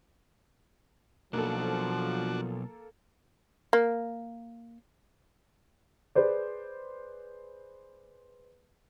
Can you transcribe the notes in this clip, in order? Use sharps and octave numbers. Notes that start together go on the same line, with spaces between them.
B1 F3 A#3 D4 F#4 A4
A#3
G#4 B4 C5 D5